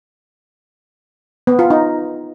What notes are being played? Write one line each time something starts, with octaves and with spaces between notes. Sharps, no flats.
B3
F4
D#4